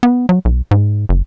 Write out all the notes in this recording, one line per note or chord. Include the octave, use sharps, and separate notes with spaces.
B3
F#3
B1
G#2
F#1